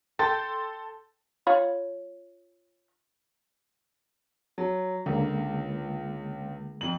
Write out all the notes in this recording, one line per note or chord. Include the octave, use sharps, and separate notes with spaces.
A4 G5 C6 A6
F4 C#5 B5
F#3
C#2 D3 G#3 A#3
F2 F#7